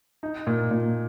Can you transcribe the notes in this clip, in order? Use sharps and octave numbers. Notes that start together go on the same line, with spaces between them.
D#4
A#2
A#2